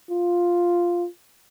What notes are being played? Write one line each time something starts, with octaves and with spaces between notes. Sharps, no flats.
F4